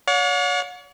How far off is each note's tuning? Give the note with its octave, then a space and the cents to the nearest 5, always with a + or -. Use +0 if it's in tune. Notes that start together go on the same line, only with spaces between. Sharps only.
C#5 +40 F#5 -45